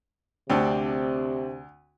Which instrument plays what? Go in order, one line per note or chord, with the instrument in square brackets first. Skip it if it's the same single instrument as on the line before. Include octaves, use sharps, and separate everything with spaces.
[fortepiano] D2 [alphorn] C3 [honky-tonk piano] C4 D4